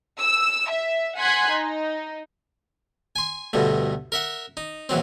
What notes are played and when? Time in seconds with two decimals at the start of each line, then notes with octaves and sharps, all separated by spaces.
0.20 E6
0.70 E5
1.18 F#5 G#5 C6 F#6 G#6 B6
1.48 D#4
3.16 G#5 C6
3.53 D2 G2 B2 D3
4.12 A#4 E5 F#5
4.57 D#4
4.89 A#1 E3 F#3 C4